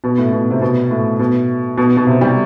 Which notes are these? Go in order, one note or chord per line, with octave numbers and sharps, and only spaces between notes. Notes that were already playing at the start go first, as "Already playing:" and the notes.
B2
A2
B2
C3
B2
A2
B2
B2
B2
C3
G3